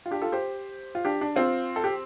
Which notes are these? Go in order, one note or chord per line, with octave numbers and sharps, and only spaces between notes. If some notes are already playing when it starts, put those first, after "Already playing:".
F4
D4 G4
F4 A4
G4 C5
F4
D4 G4
D4
C4 F4
A4
G4